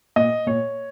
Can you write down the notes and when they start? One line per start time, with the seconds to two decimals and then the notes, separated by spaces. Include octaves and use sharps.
0.16 A#2 D#5
0.46 A#2 C#5